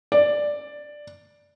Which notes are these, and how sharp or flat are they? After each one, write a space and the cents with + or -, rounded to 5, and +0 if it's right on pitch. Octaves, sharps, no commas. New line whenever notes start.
D5 +5